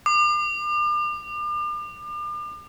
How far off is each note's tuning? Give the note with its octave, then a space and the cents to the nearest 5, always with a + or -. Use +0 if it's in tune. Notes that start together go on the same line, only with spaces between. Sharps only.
D6 +40